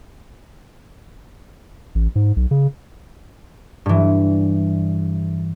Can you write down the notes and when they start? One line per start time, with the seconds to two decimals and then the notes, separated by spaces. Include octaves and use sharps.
1.95 A1
2.16 G#2
2.36 B1
2.51 C#3
3.86 G2 E3